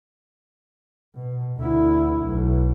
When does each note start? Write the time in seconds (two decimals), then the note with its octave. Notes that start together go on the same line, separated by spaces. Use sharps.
1.15 B2
1.58 D2 E4
2.25 B1